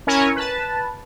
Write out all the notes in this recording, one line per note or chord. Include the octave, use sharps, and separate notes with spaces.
C#4 E4 A#4 C#5 G#5
B4 A5